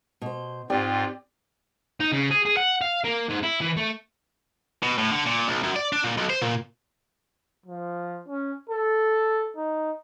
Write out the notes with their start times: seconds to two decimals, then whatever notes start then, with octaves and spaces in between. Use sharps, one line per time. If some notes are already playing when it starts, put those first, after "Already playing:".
0.22 B2 C5
0.70 G#2 C4 F4 G4 D5
2.00 D#4
2.12 C#3
2.30 G#4
2.45 G#4
2.57 F#5
2.82 F5
3.04 A#3
3.29 G#2
3.43 E4
3.61 E3
3.77 A3
4.83 B2
4.98 A2
5.11 D3
5.26 A#2
5.48 B1
5.63 F#2
5.76 D5
5.93 D4
6.04 A#2
6.18 B1
6.30 C5
6.42 A#2
7.66 F3
8.29 C#4
8.69 A4
9.56 D#4